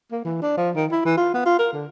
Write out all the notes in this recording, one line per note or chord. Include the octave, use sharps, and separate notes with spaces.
A#3
E3
D4
F3
D#3
E4
E3
F4
B3
F4
A#4
D3